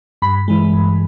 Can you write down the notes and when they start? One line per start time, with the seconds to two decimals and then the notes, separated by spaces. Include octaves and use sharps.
0.22 G2 B5
0.48 E3 G#3
0.73 G2